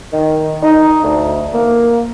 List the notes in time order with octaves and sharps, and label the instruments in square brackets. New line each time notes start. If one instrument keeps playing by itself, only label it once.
[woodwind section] D#3
D#4
D2
A#3